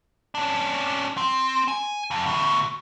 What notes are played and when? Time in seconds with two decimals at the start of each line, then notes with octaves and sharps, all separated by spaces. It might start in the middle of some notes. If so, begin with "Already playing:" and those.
0.35 C#4 D4
1.17 C4
1.68 G#5
2.11 F2
2.26 D2 B2